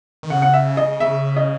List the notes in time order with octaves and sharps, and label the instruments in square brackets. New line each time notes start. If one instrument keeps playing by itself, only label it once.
[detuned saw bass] D#3
[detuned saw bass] C#3 [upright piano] F#5
[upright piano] F#5
E5
D#5
E5
D#5